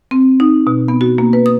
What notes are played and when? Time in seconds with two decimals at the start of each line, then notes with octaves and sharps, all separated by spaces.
0.11 C4
0.40 D#4
0.67 B2
0.88 B3
1.01 F#4
1.18 A#3
1.33 B4
1.46 D#6